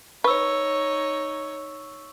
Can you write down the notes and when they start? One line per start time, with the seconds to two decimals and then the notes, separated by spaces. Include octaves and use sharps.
0.24 D#4 B4 C#5 C#6 E6